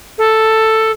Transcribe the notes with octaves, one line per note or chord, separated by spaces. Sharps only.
A4